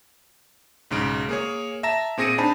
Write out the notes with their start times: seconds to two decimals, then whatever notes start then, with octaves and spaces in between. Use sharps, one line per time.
0.91 B1 G#2 C#3 D7
1.29 A#3 G#4 C#5
1.83 E5 A5 A#5 A#6 E7
2.18 A#2 C4 G#4 A#6 C#7 D#7
2.38 D4 D#4 C5 G#5 A5 B5